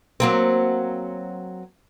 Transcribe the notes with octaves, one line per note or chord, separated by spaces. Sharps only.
F#3 A#3 C4